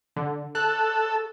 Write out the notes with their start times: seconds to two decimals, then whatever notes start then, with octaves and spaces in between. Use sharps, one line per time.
0.16 D3
0.55 A4 F#6